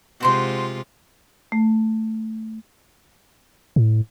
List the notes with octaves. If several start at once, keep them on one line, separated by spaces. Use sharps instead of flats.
C3 G#3 F4 F#4 C5 C6
A3
A2